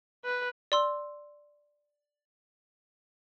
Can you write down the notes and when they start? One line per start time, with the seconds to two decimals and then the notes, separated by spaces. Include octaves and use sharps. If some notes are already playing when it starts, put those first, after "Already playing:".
0.25 B4
0.72 D5 C6 E6